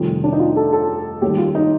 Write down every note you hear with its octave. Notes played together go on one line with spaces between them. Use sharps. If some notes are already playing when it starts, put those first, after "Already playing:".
Already playing: F1 F2 D#3 G3
D4
D#4
F4
A4
A4
D#2 D#3 G3 G4
F4
D#4